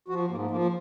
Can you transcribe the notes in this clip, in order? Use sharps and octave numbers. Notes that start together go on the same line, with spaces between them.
F3 F#4
G#2 A#3
F3 A#3